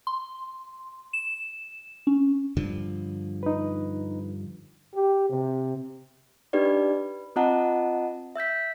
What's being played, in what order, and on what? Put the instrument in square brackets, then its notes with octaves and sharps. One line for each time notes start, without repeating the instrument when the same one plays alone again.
[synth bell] C6
E7
C#4
[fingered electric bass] G2 D3 F3
[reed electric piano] D#4 B4
[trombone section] G4
C3
[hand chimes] D4 D#4 G4 B4 D5
B4
C4 F4 D#5 F#5 A5 A#5
E5 E6 G6 B6